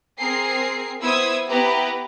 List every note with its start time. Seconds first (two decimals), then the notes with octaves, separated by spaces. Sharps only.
0.18 C4 G#4 A#4 C7
1.01 B3 E4 C5 D#6 E6 G#6
1.48 B3 E4 G4 B4 A#5